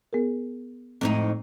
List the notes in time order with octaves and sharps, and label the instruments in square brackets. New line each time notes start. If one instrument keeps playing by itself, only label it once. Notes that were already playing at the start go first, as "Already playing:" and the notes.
[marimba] B3 G#4 A#4
[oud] F2 A2 D#4 [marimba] G#3 C4